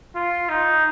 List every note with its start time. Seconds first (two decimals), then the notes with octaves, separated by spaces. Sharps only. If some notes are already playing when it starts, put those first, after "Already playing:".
0.16 F4
0.49 D#4